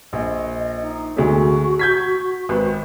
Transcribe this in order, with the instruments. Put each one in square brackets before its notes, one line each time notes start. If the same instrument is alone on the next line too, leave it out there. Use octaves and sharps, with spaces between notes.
[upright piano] A#1 [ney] D#5
[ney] D#4
[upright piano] D2 G#3 A3 [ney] F#4
[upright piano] G6 G#6 B6
G#1 B4